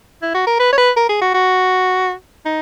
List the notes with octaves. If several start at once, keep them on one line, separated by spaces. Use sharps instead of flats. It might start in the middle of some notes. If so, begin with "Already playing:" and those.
E4
F#4
A#4
B4
C#5
B4
A#4
G#4
F#4
F#4
D#4